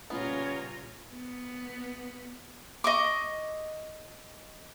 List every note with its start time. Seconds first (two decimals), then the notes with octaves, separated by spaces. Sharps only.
0.10 A#2 C#3 G3 B3 C#4 F4 C#5 A#5
1.14 B3
2.84 D#5 C#6 D6